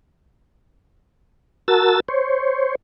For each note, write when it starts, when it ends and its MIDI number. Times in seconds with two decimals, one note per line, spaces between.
1.68 2.00 66
1.68 2.00 70
1.68 2.00 81
1.68 2.00 88
1.68 2.00 93
2.09 2.75 72
2.09 2.75 73